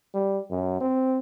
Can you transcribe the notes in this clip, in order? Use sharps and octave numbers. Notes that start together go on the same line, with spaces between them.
G3
F#2
C4